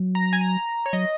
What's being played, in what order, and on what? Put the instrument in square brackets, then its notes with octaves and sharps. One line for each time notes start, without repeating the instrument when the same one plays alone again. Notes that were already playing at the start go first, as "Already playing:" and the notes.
Already playing: [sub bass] F#3
[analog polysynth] A#5
G#5
A#5
C#5
[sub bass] F#3 [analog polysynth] D#5